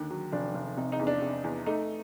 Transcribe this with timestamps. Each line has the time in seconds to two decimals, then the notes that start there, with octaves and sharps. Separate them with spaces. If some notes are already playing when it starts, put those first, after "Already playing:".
Already playing: D#2 D3
0.10 F#3
0.32 F1 D4
0.55 F1
0.77 C3 D#4
0.92 D#4
0.99 E2
1.07 D4
1.22 C3
1.44 E2
1.67 A3 D#4